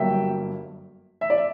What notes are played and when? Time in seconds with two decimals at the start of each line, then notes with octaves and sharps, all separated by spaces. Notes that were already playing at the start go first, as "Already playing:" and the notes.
Already playing: G1 G2 F#3 A#3 E5 G5
1.21 E5
1.30 D5
1.38 E5